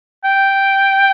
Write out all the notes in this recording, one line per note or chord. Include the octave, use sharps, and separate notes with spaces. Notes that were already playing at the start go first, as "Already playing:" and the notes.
G5